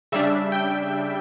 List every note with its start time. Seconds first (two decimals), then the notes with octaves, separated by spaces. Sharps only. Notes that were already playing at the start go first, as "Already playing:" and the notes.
0.12 C#3 G3 D4 E5
0.52 G5